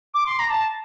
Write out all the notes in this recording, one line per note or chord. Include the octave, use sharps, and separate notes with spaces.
D6
C6
A#5
A5